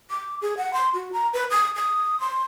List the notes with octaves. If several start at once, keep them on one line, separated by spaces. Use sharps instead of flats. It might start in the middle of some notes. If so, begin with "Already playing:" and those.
D6
G#4
F#5
C6
F#4
A#5
B4
D#6
D#6
C6